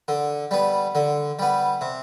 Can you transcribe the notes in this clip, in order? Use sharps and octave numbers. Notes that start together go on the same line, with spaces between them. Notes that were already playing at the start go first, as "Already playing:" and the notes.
D3
G3 B3
D3
G3 B3
C3